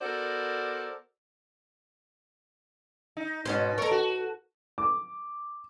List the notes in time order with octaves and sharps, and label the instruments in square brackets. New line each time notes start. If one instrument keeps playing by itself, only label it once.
[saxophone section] B3 F#4 A4 A#4 C5 D5
[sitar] D#4
[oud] G#2 C#4 C5 [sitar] B2
[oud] A4 C#5 [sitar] A#4
[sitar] F#4
[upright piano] D6